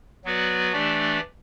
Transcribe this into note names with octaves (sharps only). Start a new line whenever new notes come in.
F#3 B3 F#4 B4 D5
E3 A3 D4 G4 D5